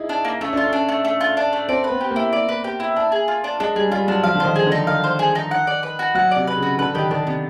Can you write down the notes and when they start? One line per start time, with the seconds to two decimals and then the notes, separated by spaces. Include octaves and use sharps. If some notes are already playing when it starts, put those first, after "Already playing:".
Already playing: D#4 E4 G#4
0.09 D4
0.25 A#3
0.41 A3 C#4
0.53 D4 F4
0.64 C#4
0.73 D4
0.89 A3
1.05 A3
1.21 F4
1.37 D4
1.53 A3
1.69 C4 D5
1.84 B4
1.90 B3
2.01 G4
2.11 A#3
2.16 E4
2.32 D5
2.49 B4
2.64 G4
2.80 E4
2.96 D4
3.12 G#4
3.28 F4
3.44 D4
3.60 G#3 D4
3.76 G3 G#4
3.92 G3 F4
4.08 F#3 D4
4.23 F3 F5
4.35 D3
4.40 D#3 C5
4.56 G#4
4.67 D3 D#4
4.87 D#3 F5
5.04 C5
5.19 G#4
5.35 D#4
5.51 F#5
5.67 D5
5.83 B4
5.99 F#4
6.15 F#3 F#5
6.31 C3 D5
6.47 B4
6.57 C#3
6.63 F#4
6.79 D3 B4
6.95 D#3 G4
7.11 D#3 D4
7.26 C3 B3